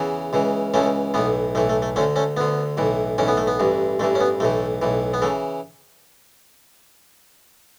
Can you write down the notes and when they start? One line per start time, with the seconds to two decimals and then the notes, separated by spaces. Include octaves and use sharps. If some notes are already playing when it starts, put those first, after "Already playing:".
Already playing: E2 C#3 E3
0.33 C#2 C#3 E3
0.74 C#2 C#3 E3 A3 C#4
1.14 B1 A2 E3 B3
1.55 B1 A2 E3 A3
1.69 A3
1.82 A3
1.96 D2 D3 A3 C#4
2.16 A3 C#4
2.37 D2 D3 B3
2.77 B1 A2 E3
3.18 B1 A2 E3 C#4
3.28 B3
3.37 A3
3.47 B3
3.59 A1 G2 E3
4.00 A1 G2 E3 A3
4.15 C#4
4.20 B3
4.40 B1 A2 E3 A3
4.82 B1 A2 E3
5.14 B3
5.22 C#3 E3 A3